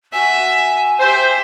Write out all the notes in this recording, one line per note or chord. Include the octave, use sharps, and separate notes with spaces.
F#4 E5 G#5
G4 C5 E5